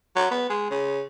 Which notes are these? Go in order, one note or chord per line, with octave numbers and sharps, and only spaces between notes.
F#3
B3
G#3
C#3